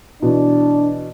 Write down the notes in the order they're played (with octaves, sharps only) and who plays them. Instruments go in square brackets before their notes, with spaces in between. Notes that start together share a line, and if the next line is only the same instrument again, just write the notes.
[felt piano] B2 E3 [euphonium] D4